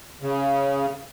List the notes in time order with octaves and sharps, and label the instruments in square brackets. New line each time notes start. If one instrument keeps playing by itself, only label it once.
[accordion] C#3